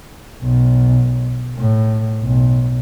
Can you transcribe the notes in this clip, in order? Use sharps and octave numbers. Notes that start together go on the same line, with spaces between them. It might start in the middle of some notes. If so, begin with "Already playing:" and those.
B1
A2
B1